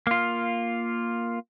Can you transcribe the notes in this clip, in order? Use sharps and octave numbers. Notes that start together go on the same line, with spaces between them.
A#3 F4